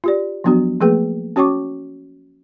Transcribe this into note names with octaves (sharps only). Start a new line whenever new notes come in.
F4 G4 D5
F3 F#3 B3 D4 F#4
F3 A3 A#3 G#4 B4 G5
C#4 F#4 C#5 G5 C#6 D6